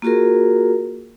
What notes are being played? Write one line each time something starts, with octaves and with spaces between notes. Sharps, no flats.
A#3 F4 F#4 G#4 A#4